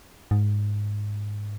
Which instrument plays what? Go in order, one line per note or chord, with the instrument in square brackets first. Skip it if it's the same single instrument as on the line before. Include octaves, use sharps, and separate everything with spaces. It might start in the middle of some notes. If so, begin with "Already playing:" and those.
[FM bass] G#2